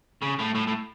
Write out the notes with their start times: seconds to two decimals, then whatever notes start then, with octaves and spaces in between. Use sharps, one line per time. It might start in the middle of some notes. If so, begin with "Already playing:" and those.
0.22 C#3
0.39 A2
0.55 A2
0.67 A2